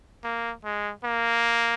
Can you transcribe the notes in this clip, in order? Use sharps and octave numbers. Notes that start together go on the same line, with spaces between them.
A#3
G#3
A#3